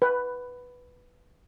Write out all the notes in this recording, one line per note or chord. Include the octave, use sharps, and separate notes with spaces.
B4